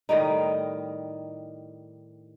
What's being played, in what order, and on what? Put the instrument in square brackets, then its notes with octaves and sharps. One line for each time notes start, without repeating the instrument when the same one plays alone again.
[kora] A2 D#3 G3 D#4